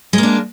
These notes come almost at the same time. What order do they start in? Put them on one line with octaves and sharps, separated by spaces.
G#3 A#3 D4